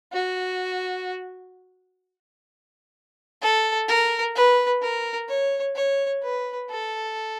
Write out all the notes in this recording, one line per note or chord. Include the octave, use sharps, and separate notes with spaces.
F#4
A4
A#4
B4
A#4
C#5
C#5
B4
A4